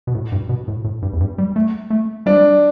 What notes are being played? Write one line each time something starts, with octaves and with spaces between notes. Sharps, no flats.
B2
A2
G2
B2
A2
A2
G2
E2
G2
G3
A3
A3
G3 D4